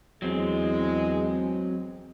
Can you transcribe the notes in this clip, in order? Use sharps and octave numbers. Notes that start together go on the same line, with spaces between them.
E2 F#3 G#3 C4